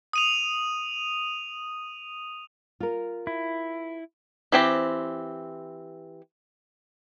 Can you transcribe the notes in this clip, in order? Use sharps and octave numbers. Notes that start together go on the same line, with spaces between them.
D#6 D#7 F7
F4 A#4
E4
E3 C4 G4